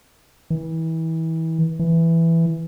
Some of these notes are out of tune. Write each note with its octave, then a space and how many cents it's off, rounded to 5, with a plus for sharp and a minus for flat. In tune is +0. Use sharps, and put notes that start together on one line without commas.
E3 -30
E3 +5